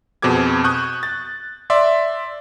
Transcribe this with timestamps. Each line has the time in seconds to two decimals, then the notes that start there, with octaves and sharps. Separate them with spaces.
0.22 F2 B2 C4 G#4 D6 G#6
0.64 C#6 D#6 F#6 G6
1.03 A6
1.70 D5 E5 C6